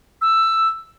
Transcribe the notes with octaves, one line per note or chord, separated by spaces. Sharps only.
E6